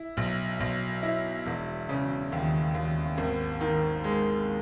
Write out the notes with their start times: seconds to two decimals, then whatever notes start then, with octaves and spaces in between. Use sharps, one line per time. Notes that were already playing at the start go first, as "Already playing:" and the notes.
Already playing: E4
0.17 B1
0.60 B1
1.03 E4
1.46 E1
1.89 C#3
2.32 D#2
2.74 D#2
3.18 G#1
3.61 D#3
4.04 G#3